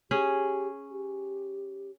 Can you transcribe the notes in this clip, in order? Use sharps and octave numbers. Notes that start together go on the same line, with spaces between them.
C#4 G4 G#4
G4